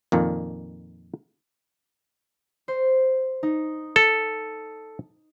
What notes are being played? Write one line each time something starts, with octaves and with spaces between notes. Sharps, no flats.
F2 A#2 D#3
C5
D#4
A4